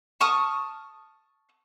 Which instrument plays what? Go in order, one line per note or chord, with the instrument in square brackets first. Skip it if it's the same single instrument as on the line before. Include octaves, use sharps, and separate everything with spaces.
[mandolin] A5 C#6 D#6 F6